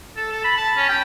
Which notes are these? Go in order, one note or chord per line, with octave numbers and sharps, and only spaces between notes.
A4
A4
B5
A5
C#4
G5